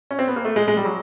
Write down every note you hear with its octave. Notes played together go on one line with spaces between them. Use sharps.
C#4
C4
B3
A#3
A3
G#3
G#3
G3
F#3